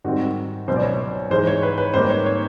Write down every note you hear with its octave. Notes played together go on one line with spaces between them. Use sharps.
G#2 D#3 G3 C4 F#4
C#2 B2 F#3 C5
D5
C#5
G#2 E3 G#3 C5
C#5
B4
B4
G#2 D#3 G3 A#3 C5
C#5
C#5